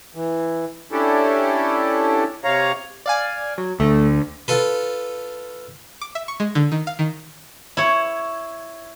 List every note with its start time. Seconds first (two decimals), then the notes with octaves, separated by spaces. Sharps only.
0.15 E3
0.92 C#4 D4 E4 G4 A4
2.44 C3 C#5 F5 A#5
3.06 D5 F5 G#5
3.58 F#3
3.80 D2 A3
4.48 F4 A4 B4
6.01 D6
6.15 E5
6.28 C#6
6.40 G#3
6.55 D3
6.72 D#3
6.87 F5
6.99 D#3
7.77 E4 C#5